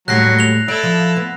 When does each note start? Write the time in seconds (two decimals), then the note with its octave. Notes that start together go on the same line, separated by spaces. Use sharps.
0.08 D#2 A2 F#3 G3 F#6 A#6 C7
0.39 F7 G7
0.68 E4 A4 D5
0.83 F3
1.17 B3